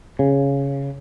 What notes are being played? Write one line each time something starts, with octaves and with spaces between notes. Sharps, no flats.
C#3